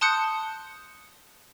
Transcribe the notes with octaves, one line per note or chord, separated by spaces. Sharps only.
A5 C6 D#6 F#6 G6 C#7